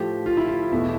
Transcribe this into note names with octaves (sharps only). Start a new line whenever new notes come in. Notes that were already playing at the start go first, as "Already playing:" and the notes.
Already playing: A2 F3 A3 G4
F4
E4
F4
E2 B2 A3 E4